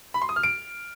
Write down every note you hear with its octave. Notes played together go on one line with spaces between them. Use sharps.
B5
C6
D#6
F6
D7